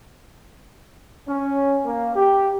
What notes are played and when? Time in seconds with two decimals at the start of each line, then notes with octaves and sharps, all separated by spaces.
1.28 C#4
1.86 A#3
2.16 G4